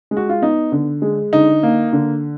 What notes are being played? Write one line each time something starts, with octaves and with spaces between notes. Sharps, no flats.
G#3
F#4
F4
B3 D#4
D3
G#3
D3 D#4
A#3
D3